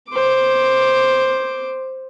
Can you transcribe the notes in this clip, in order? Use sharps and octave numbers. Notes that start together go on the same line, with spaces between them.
C5 D6